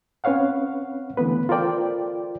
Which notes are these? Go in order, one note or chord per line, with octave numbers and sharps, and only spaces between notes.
C4 C#4 B4 C#5 F5 F#5
D3 E3 A3 B3 B4
F4 A4 A#4 C5 D5 G5